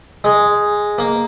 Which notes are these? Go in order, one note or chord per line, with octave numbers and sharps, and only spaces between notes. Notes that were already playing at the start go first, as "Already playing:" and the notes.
G#3
A#3